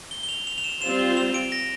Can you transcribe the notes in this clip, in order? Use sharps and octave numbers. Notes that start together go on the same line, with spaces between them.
G7
G7
F7
F7
F7
E7
G3 C4 F4 C5 E7
G7
F7
D7
A#6